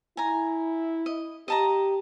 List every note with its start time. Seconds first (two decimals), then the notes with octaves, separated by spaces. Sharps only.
0.17 E4 G#5 A#5
1.06 D#5
1.48 G4 D#5 A5 A#5